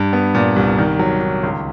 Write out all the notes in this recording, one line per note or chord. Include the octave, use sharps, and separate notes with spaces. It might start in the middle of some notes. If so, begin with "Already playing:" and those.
Already playing: G2
B3
A#2
C2
D#3
F#3
D#3
C#2